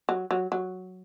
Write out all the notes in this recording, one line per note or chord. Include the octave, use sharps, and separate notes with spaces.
F#3
F#3
F#3